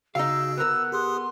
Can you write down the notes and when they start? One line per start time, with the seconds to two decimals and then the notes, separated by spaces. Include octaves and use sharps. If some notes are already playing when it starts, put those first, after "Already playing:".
0.15 C#3 D#4 F#4 G#4 F5 E6
0.57 B3 A#4 E6 F#6
0.92 G4 G#4 C6 D#6